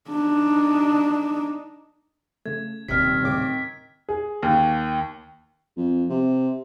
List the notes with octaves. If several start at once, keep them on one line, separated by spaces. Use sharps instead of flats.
D4 D#4
C#3 A3 G#6
D#1 C3 D#3 C4 F6 B6
A2 C#3 D6
G#4
D#2
F2
C3